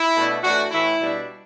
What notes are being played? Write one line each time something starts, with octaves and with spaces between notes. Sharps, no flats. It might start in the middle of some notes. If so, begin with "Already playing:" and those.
Already playing: E4
B2 A3 D4
A2 E3 A3 D4 F#4
A2 E3 A3 E4
B2 G3 D4